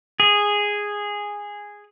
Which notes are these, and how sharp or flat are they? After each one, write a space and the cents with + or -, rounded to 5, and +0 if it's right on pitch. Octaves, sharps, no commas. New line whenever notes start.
G#4 -10